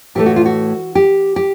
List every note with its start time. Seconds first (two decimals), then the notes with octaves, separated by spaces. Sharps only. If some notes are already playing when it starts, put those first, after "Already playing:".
0.15 A2 E3 A3 G4
0.26 F#4
0.36 F4
0.46 F#4
0.95 G4
1.36 G4